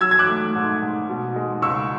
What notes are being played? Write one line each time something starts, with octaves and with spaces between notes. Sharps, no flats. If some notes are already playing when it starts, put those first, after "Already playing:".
F#3 E6 G#6
G#6
D6 F#6
A3
G#2
G#2
B2
G#3
C#2 C#6 E6